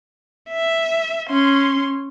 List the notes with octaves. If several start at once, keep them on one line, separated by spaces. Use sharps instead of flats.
E5
C#4 C6